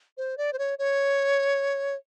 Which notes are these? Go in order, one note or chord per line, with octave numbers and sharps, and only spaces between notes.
C5
D5
C5
C#5
C#5